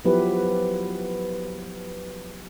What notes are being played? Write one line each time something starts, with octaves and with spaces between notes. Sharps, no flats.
F3 F#3 B3 E4 G4 B4